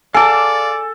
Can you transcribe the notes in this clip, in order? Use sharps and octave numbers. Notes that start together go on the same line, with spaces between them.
A4 D5 F5 G#5 A5 D6